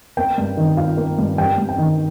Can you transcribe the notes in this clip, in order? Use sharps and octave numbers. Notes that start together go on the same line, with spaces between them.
A#3 G5
G2
D#3
F4 F5
A#3
G2
G3 G5
G2
G5
D#3